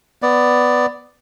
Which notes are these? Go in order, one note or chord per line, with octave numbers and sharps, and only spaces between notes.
B3 D5